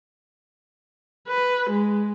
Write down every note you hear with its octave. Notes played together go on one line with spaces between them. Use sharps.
B4
G#3